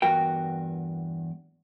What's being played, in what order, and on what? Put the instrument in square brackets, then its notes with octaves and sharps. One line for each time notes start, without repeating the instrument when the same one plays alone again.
[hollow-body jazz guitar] E2 G2 F#4 A#4 G5